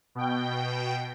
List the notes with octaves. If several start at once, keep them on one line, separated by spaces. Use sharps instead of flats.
B2 G5